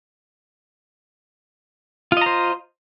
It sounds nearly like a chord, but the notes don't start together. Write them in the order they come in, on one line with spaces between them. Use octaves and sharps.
F4 D#5 A#5 C5